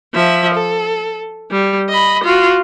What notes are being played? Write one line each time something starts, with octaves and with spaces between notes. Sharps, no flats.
F3 E5
A4
G3
D#5 B5
F4 F#4